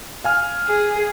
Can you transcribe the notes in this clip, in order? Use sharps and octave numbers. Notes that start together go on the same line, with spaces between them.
F5 G#5 F6
G#4